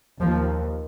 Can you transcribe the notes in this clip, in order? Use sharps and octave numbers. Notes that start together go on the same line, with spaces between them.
D#2 F3